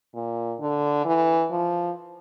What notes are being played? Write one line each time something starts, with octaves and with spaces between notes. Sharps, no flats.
A#2
D3
E3
F3